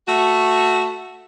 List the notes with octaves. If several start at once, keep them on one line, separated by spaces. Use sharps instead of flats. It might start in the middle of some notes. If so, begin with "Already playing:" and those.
A3 F#4